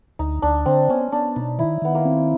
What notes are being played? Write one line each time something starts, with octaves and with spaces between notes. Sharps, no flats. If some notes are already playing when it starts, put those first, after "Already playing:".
D2 D#4
D2 D4
D3 C4
B3 C#4
B3 D4
B2 D#4
D#3 E4
D#3 B3
A#3
C4